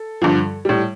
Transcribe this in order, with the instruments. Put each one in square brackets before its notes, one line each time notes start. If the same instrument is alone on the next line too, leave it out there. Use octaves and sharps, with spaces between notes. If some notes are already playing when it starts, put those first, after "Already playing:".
Already playing: [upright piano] A4
G2 D3 F3
A2 G3